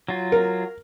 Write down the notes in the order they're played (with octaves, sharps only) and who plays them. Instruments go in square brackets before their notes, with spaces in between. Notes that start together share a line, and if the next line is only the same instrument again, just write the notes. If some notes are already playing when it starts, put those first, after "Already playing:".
[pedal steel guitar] F#3 F4
[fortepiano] A#4